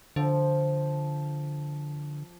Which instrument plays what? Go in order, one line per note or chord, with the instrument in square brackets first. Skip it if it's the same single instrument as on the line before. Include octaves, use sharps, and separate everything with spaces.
[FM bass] D3 [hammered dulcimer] F3